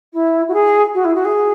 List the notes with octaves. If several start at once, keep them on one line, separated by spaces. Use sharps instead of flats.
E4
F#4
G#4
F#4
E4
F#4
G#4